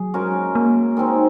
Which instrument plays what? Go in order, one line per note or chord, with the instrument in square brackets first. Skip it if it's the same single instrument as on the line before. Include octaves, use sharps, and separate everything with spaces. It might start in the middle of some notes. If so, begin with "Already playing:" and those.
Already playing: [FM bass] F#3 [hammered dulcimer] G#4
[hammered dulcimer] G#3 C#4 F#4 A#4
[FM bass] A#3
[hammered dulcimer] D#3 G#3 C4 D#4